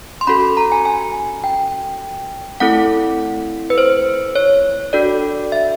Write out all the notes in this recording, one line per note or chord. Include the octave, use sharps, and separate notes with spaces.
C6
C#4 F#4 A4 B5
A#5
G#5
G#5
G5
A3 C4 E4 A4 F#5
B4
C5
C#5
D4 F#4 A4 D5
E5